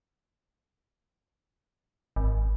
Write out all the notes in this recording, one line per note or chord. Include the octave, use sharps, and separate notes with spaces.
G#1